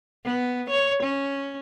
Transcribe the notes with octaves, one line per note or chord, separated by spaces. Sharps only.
B3
C#5
C#4